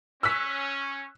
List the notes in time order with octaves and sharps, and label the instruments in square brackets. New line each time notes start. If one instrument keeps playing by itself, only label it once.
[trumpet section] C#4 [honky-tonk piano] E6 F#6 B6